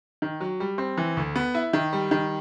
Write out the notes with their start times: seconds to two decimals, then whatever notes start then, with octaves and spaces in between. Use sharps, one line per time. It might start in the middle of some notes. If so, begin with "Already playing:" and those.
0.22 D#3
0.40 F#3
0.60 G3
0.78 C4
0.98 E3
1.17 D2
1.35 B3
1.54 E4
1.73 D#3
1.93 G3
2.11 D#3